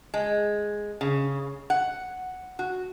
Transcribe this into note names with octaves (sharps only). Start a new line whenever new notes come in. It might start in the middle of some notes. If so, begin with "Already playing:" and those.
G#3
C#3
F#5
F#4